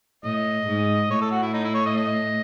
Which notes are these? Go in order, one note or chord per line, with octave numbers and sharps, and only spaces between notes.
A2 D#5
G#2
A2 C#5
A4
F#4
E4
D#4
E4
C#5
D#5
D#5